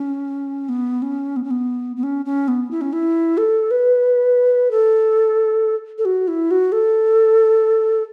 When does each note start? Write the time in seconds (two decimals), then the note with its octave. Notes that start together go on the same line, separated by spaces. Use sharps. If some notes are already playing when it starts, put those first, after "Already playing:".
Already playing: C#4
0.69 B3
1.02 C#4
1.36 B3
1.44 C#4
1.51 B3
1.96 B3
2.03 C#4
2.25 C#4
2.48 B3
2.71 E4
2.81 C#4
2.93 E4
3.38 A4
3.71 B4
4.71 A4
5.98 A4
6.05 F#4
6.28 E4
6.51 F#4
6.72 A4